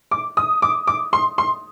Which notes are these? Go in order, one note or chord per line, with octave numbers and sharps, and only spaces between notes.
D6
D#6
D6
D6
C6
C6